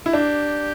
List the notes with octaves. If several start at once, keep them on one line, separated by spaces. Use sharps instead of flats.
E4
D4 G4